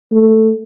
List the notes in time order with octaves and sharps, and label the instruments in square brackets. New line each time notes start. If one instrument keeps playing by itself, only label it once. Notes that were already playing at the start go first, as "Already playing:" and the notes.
[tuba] A3